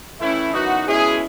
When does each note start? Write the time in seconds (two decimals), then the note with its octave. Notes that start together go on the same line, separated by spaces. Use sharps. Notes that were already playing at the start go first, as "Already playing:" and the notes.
0.19 A2 E3 A3 C#4 E4
0.52 F#2 E3 B3 D#4 F#4
0.86 B2 G#3 C#4 E4 G#4